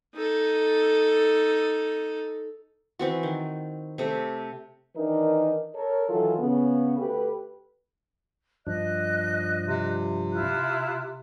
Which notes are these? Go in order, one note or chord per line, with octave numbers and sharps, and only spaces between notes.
D#4 A4
E3 C4 F#4
D#3
C3 A3
D#3 E3 D4 D#4 A#4 B4
A4 A#4 C#5
D#3 E3 F#3 F4 A4
C#3 B3
D2 G4 A4 B4
G2 F3 D4 D#5 F#6
C3
E4 F4 F#6